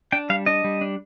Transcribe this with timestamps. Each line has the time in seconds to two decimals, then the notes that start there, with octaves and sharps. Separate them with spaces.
0.12 D4 G5
0.30 G3 F5
0.46 D4 D#5
0.64 G3
0.81 D4